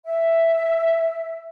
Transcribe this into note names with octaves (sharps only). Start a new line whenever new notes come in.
E5